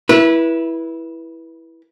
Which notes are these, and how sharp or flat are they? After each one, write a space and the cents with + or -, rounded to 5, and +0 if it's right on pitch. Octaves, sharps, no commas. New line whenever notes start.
E4 +0 B4 -25